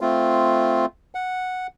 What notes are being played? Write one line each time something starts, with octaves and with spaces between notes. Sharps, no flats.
A3 C4 F4
F#5